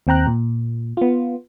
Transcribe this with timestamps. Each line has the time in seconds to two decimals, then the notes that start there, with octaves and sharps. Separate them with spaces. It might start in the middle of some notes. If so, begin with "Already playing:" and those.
0.07 D#2 C4 G5 A#5 F#6
0.27 A#2
0.97 B3 F4